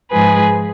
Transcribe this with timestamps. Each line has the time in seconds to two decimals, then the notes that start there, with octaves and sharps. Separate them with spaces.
0.11 G#2 F3 G#3 G#4 B4